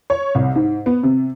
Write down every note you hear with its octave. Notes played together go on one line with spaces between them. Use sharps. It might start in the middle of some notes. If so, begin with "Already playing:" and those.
C#5
C2
G#2
B3
C3